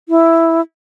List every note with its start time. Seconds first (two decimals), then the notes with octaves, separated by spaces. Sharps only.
0.09 E4